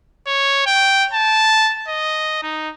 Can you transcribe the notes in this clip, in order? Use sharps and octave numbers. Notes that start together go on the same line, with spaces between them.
C#5
G5
A5
D#5
D#4